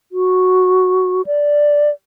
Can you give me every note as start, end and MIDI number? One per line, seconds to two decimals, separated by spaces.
0.12 1.22 66
1.26 1.90 74